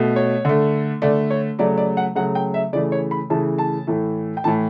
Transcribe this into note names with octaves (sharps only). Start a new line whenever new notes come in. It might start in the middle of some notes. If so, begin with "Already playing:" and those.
Already playing: B2 A3
C#5
D3 A3
D3 A3 D5
C#5
C#3 F#3 A3 D5
D5
F#5
C#3 F#3 A3 F#5
G5
E5
C#3 E3 A3 D5
C#5
B5
C#3 E3 A3 A5
A5
A2 E3 A3
G5
A2 E3 A3 A5